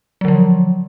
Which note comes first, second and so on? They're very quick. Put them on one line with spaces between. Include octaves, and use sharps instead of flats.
F#3 D3 F3